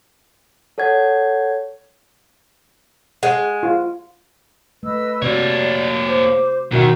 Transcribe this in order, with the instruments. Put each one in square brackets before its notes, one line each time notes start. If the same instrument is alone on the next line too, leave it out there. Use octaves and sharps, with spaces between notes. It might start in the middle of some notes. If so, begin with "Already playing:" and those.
[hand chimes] A4 C#5 F#5 G#6
[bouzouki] G#3 [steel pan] F#5
[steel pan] F4
[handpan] A3 [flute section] B4 D#5 E6
[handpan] C3 F#4 [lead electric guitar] A#3 C#5 [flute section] D5
[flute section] C5 D6
[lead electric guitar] D#2 D#3 [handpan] B2 F#4 E5 [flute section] A#4